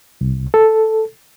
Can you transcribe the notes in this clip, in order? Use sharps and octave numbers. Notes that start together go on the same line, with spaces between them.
C2
A4